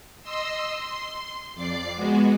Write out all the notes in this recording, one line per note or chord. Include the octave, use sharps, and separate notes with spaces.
D#5 C6 E6
C6
F2 D5 D6 C7
G#3 B3 F#4